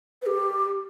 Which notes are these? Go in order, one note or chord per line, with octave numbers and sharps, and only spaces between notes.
B4
G4